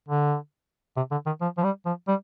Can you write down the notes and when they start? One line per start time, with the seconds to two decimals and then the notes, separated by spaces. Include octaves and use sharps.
0.08 D3
0.97 C3
1.11 D3
1.26 D#3
1.41 F3
1.58 F3
1.63 G3
1.86 F3
2.08 G3